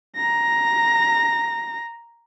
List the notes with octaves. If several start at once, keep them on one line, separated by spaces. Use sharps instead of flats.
A#5 A#6